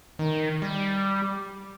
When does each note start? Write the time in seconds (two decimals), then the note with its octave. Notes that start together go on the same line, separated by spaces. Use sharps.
0.19 D#3
0.62 G3